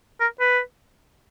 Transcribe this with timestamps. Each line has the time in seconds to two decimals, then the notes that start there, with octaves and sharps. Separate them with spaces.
0.20 A#4
0.40 B4